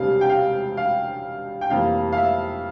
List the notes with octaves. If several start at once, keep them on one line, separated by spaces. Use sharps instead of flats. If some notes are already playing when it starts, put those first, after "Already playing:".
Already playing: E1 D2 C3 G3 F5
G5
F5
F5
G5
F1 F2 E3 G3 A#3 F5
F5
E5